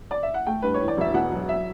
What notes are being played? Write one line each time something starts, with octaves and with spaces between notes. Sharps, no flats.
D5
E5
F#5
A3 G5
G2 B4
C#5
E3
D5
E1 E5
B2 F#5
F#3
E5